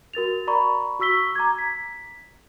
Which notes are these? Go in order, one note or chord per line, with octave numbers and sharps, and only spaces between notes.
F#4 A#4 A6 F7
D5 A#5 B5 C#6
F#4 C#6 E6 B6 G7
A#5 D6 G#6
B6